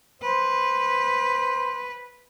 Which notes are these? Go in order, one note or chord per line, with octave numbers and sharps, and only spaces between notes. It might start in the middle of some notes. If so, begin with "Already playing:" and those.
B4 C5